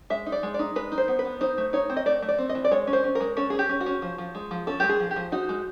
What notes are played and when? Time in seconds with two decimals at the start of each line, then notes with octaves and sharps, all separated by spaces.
0.10 G#3 E5
0.26 D#4
0.32 D5
0.43 G#3
0.54 D#4 D5
0.76 G#3 B4
0.92 D#4
0.98 C5
1.08 B3
1.19 B4
1.25 B3
1.41 D#4 C5
1.58 A3
1.73 D#4 C#5
1.90 C4
1.97 D#5
2.06 A3 D5
2.22 A3
2.28 D5
2.38 C4
2.49 D#5
2.55 E3
2.65 D5
2.71 G#3 C#5
2.87 C#4
2.93 C5
3.04 C#4
3.15 A#4
3.20 G#3
3.37 C#4 A4
3.50 C#4 G#4
3.59 G4
3.69 C#4
3.80 F#4
3.86 C#4
4.02 F3
4.18 F3
4.35 G#3
4.51 F3
4.67 C#4 A4
4.80 G#3 G4
4.89 G#4
5.00 F3
5.11 G4
5.16 F3
5.32 D#4 F#4
5.49 G#3